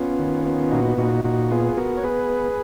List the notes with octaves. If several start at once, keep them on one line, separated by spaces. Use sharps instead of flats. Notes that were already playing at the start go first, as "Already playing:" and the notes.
Already playing: B3 C#4 F4
D#3
B3
A#2 D#4 F#4
A#2 D#4 F#4
A#2 D#4 F#4
B3 F4 G#4
B3 F#4 A#4
C#5
B3 G#4 B4